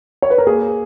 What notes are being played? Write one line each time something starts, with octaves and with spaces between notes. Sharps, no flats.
C#5
B4
A#4
A#3 G#4